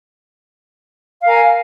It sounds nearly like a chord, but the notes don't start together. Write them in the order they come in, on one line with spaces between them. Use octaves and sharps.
F5 A#4 G#5